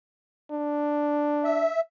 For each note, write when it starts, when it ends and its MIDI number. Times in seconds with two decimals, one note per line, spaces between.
0.51 1.67 62
1.44 1.81 76